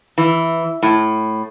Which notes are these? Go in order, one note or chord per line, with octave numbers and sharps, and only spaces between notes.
E3
A2